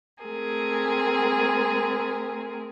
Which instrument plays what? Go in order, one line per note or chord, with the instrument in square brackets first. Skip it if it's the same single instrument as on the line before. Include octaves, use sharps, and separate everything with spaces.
[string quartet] A3 C4 G#4 A#4